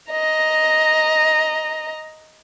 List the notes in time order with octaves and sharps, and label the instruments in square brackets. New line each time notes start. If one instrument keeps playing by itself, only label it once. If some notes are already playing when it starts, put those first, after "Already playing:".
[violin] D#5 A#5